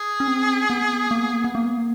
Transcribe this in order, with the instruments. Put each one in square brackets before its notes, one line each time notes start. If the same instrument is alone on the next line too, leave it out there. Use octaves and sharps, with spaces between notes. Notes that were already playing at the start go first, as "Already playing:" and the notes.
Already playing: [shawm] G#4
[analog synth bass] C#4
C4
B3
A#3
B3
A#3
B3
A#3
B3
A#3